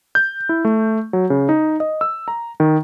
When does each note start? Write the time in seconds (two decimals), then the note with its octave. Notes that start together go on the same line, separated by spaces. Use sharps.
0.15 G6
0.49 E4
0.65 A3
1.13 F#3
1.30 C#3
1.49 D#4
1.80 D#5
2.01 E6
2.28 A#5
2.60 D#3